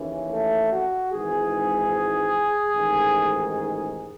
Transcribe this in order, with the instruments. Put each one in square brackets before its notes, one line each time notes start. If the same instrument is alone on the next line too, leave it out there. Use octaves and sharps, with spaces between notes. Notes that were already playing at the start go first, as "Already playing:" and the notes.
Already playing: [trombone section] D#2 C#3 E3
A3
F#4
G#1 G#2 E3 G#4
A1 G#2 D#3